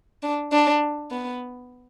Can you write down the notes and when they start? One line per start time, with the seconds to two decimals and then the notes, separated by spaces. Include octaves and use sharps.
0.23 D4
0.52 D4
1.11 B3